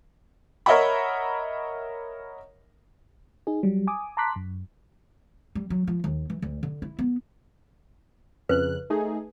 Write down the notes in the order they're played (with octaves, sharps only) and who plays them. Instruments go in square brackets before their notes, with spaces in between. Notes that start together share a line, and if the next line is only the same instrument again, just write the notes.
[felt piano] A#4 C#5 D#5 E5 F#5 B5
[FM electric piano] D#4 G#4
F#3 G3
G#5 D6 D#6
A5 A#5 C6 D6 F#6 B6
F#2
[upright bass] G3
F#3
F3
D#2
E3
D2
D3
E4
B3
[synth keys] F2 C#3 F#6 [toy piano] B4
[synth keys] A3 D#4 G#4